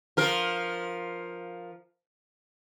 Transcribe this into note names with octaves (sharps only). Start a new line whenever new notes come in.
F3 A#4